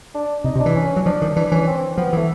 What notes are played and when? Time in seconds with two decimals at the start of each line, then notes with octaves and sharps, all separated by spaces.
0.14 D4
0.44 C3 D#4
0.55 C3
0.60 D4
0.66 E3
0.75 C#4
0.96 F#3
1.06 F3 D4
1.22 D#3
1.36 E3 D4
1.51 E3 C#4
1.67 C4
1.98 F3 B3
2.13 E3 A3